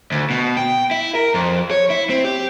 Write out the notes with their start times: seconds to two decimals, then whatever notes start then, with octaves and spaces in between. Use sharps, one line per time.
0.12 D2
0.30 B2
0.57 G5
0.91 E4
1.15 A#4
1.34 F2
1.71 C#5
1.90 E4
2.10 C4
2.25 G4